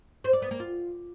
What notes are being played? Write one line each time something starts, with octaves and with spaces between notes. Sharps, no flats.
C5
D5
B3
A#3
F4